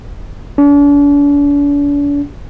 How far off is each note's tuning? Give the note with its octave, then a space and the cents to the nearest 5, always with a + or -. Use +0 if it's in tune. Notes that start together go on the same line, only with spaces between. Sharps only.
D4 -45